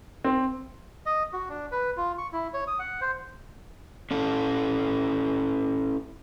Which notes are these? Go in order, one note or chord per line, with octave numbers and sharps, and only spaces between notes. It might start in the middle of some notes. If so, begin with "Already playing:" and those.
C4
D#5
F#4
D4
B4
F4
C#6
E4
C#5
D#6
F#5
C5
C#4 E4 A4